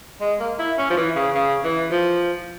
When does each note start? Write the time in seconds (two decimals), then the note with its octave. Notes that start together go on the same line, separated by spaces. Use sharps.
0.21 G#3
0.40 A#3
0.59 E4
0.78 C#4
0.90 F3
0.97 E3
1.16 C#3
1.35 C#3
1.64 E3
1.91 F3